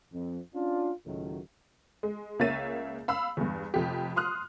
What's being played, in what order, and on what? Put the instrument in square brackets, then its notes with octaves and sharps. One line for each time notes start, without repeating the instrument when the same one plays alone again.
[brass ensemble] F2
C#4 D4 F4
C#2 A2 D#3 F#3
[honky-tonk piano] G#3
C#2 A#3 C#5 E5 A6 D#7
F5 B5 E6
E2 G2
F1 F2 G4
C6 D#6 F6 F#6